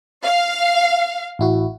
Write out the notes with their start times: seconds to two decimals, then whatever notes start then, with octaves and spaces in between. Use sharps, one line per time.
0.23 F5
1.39 A1 E4 F#4